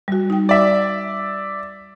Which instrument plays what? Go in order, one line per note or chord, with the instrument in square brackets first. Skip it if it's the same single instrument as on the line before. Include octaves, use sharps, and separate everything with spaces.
[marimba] G3 F#4
D#4 G5
[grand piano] D5 E5